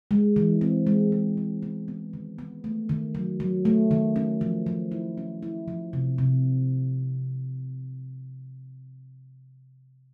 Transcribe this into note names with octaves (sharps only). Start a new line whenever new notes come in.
G#3
E3
C4
G#3
G#3
G#3
B3
B3
D#3
B3
A3
D#3
F#3
F#3
A3
D#3
C#4
F3
F3
E4
C#4
E4
F3
C3
C3